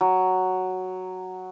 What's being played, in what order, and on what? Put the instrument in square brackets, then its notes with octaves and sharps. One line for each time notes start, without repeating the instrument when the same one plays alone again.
[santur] F#3